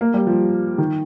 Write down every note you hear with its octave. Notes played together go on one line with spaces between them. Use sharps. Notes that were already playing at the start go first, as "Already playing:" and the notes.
A#3
G3
F3
D#3